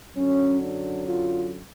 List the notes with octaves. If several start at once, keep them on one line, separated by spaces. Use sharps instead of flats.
F#2 D3 F#3 C#4
D4
F4